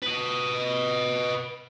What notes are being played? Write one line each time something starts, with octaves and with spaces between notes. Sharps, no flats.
B4 D#5